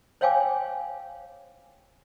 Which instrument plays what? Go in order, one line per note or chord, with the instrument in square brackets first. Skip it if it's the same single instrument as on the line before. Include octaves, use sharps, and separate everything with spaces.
[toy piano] C5 C#5 F5 G5 G#5 D6